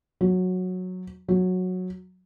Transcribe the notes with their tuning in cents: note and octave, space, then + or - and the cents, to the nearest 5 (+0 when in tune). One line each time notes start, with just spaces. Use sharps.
F#3 -10
F#3 -10